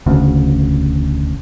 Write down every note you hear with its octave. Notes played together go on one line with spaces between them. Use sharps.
E1 D2 C#3